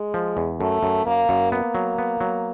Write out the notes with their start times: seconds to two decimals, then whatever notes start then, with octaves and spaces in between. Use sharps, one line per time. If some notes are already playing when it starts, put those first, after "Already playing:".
Already playing: G#3
0.14 F3
0.37 E2
0.60 F#2 A3
0.83 F#2
1.06 F#2 A#3
1.29 F#2
1.52 A#3 B3
1.75 F#3
1.99 B3
2.21 F#3